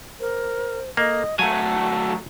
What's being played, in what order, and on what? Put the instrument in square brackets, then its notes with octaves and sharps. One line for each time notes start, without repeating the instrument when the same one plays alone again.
[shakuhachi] A#4 [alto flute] C5
[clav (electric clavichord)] A#3 [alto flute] A4 [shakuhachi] D#5
[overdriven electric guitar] F#3 A3 [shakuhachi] F#5 [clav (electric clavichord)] G#5 [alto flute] A5